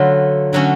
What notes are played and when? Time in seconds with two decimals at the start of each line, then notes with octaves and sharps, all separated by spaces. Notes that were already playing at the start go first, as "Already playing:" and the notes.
Already playing: D3 F#3 A3 F4 B4
0.53 D3 F#3 A3 C#4 F#4